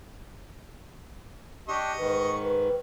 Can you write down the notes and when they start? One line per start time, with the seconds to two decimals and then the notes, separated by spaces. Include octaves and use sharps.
1.69 D4 G4 D#5 C#6
1.98 G#2 D#3 B4
2.42 B4